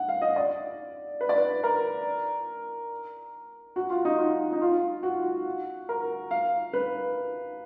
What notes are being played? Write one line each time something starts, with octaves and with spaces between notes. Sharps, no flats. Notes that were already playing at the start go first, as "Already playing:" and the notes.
Already playing: F#5
F5
D#5
D5
B4
D5
B4
A#4
F#4
F4
D#4
F4
D#4
F4
F#4
A#4
F5
B4